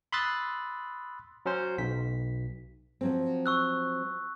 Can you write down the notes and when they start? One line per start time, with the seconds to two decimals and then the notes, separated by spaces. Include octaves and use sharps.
0.12 B5 C6 D#6 E6 F#6 A6
1.46 F#3 C#4 C5
1.78 B1 B6
3.01 F3 F#3 C4
3.46 C#6 E6 F#6